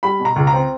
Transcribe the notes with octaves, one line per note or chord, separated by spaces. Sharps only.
G3 B5
B2
A#5
C#2
A#5
C4